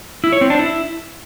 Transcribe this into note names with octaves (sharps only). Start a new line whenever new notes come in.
E4
C#5
C4
D4
E4